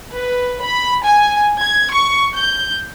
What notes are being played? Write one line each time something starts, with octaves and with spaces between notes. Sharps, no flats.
B4
B5
G#5
G#6
C#6
G6